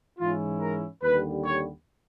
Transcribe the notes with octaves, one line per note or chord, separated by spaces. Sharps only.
G#2 E3 G#3 C#4 E4 F4
A#4
D#2 D3 G3 B4
C#5